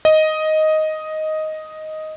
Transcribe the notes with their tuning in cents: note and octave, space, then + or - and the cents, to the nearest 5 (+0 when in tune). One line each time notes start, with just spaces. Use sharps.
D#5 +5